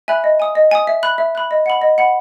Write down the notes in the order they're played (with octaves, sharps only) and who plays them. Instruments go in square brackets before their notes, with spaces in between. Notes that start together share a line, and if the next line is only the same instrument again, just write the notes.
[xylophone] E5 G#5 B5 F#6
D#5
G#5 D#6
D#5
G#5 D#6
E5
B5 F#6
E5
B5 F#6
D#5
F#5 B5
D#5
F#5 B5